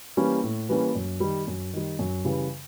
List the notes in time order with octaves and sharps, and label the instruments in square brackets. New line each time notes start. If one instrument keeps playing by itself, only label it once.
[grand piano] E3 G3 A#3 C#4
A2
E3 G3 A#3 C#4
F#2
D#3 G3
F#2
D#3 G3
F#2
C#3 E3 G3